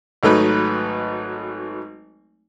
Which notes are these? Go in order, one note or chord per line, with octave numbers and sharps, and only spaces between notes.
G#1 F#3 A3 D#4 B4 F#6